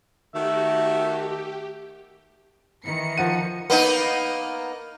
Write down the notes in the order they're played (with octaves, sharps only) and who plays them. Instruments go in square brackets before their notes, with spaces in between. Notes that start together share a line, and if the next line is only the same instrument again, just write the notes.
[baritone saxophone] D#3 [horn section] A3 F#4 [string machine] G4 [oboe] E5
[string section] D#3 E3 C#7
[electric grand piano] F3 F#5 D#7
[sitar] A#3 B3 D#4